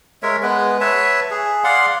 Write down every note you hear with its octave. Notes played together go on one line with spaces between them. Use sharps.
G#3 A#4 C#5 E5
G#3 B3 B4
B4 C#5 E5 A5
G#4
D5 F5 F#5 C6